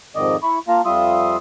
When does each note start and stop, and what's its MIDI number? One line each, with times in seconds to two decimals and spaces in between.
0.16 0.36 41
0.16 0.36 44
0.16 0.36 51
0.16 0.36 74
0.16 0.36 75
0.43 0.59 64
0.43 0.59 83
0.43 0.59 85
0.68 0.81 58
0.68 0.81 65
0.68 0.81 77
0.68 0.81 81
0.68 0.81 82
0.85 1.37 41
0.85 1.37 55
0.85 1.37 65
0.85 1.37 76
0.85 1.37 84
0.85 1.37 87